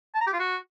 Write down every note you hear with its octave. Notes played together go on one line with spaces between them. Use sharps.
A5
A#5
G4
F4
F#4